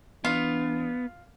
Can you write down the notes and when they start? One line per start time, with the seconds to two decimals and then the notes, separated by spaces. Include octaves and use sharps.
0.25 E3 B3 D4 F4